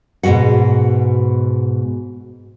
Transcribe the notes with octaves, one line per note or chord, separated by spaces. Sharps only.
G#2 B2 E3 F#4 F#5